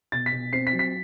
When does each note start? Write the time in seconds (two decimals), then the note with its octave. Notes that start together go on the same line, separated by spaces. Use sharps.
0.12 B2 A6
0.26 B6
0.32 B2
0.53 C4 C7
0.67 B6
0.73 F#3
0.79 B6